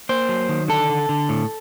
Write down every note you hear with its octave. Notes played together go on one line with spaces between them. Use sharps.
A#3 C5
F#3
D#3
D3 A4
D3
D3
A2